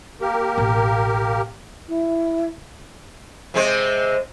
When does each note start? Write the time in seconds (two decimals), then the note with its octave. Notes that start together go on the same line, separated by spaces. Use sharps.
0.21 A#3 G4 A#4
0.58 A1 B2
1.88 E4
3.54 C3 G#3 C4